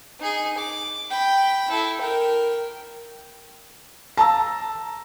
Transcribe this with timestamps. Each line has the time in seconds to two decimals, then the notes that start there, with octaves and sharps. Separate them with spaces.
0.20 D#4 G#4
0.58 D6
1.10 G5 B5
1.70 E4 A4
2.01 A#4 G5
4.17 A5 A#5 E6